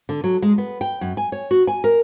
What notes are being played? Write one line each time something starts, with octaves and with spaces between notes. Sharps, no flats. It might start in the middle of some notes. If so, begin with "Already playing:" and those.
D3
F#3
G#3
B3
G5
F#2
G#5
C#5
F#4
G#5
A#4